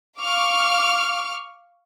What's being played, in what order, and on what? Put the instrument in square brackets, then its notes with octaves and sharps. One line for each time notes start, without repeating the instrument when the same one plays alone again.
[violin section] F5 C#6 D6 F6